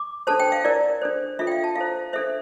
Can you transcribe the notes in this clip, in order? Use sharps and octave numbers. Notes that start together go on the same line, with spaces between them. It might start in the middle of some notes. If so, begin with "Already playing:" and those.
Already playing: D6
D4 A4 C5 A5
G5
F5
E4 A#4 D5
D4 A4 C5
D4 F4 A4 E5
G5
F5
A5
E4 A4 C5 F5
D4 A4 C5 E5